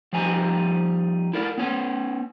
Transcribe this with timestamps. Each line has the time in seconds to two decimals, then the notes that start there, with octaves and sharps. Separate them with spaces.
0.13 F3 G3 D#4 G#5
1.33 E4 A#4 D5
1.58 B3 C#4 C#5